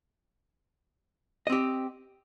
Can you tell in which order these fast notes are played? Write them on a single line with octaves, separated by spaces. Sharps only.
D#5 C4 G4